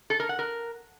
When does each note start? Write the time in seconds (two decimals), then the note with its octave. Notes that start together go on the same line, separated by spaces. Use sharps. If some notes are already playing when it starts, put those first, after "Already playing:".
0.10 A4
0.20 A#4
0.29 F#5
0.39 A#4